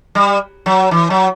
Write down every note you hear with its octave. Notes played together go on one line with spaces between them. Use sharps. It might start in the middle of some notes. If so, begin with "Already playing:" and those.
G3
F#3
E3
F#3